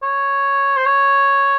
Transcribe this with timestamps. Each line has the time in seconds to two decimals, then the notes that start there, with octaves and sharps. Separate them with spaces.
0.03 C#5
0.77 C5
0.86 C#5